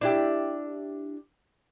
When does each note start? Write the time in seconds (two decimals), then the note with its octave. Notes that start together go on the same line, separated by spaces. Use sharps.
0.01 D4 E4 G4